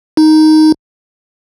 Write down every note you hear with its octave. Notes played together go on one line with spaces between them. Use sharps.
D#4